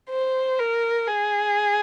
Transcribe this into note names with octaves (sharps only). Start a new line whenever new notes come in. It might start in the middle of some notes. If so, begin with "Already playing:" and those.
C5
A#4
G#4